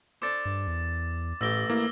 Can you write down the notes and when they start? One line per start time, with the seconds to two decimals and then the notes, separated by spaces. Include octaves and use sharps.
0.22 D4 A4 C5 D6 A6
0.46 G2
0.67 E2
1.41 A1 A2 G4 E6 A#6 G7
1.70 A#3 E4